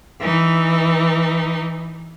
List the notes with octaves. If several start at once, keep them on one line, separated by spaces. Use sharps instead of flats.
E3 D#4